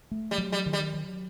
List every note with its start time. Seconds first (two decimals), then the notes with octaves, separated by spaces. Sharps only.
0.11 A3
0.31 G3
0.38 F#3
0.52 G3
0.66 D#3
0.73 G3
0.94 F#3